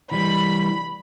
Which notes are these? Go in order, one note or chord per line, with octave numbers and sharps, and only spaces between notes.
E3 G3 B5